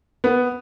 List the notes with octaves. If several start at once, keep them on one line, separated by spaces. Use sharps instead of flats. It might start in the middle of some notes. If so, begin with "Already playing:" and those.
B3